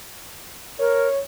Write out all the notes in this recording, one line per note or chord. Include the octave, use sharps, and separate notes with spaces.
A#4 C#5